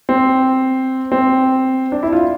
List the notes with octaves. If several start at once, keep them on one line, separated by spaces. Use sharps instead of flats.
C4
C4
D4
E4
F4